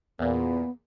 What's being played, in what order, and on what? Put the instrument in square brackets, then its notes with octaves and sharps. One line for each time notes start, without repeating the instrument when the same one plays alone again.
[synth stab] E2 A#2 [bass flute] B3